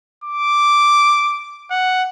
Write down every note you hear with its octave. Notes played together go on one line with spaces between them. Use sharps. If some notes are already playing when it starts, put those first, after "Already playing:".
D6
F#5